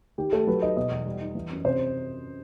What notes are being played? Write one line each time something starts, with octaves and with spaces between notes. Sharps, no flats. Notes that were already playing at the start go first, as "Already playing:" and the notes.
D#3 G4
A3 A4
F#3 B4
D#4 D#5
B2 D#5
E2
G3
D#4
E3
F#2
C3 C5